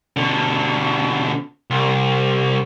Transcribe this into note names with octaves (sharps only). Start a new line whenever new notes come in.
B2 D3
C2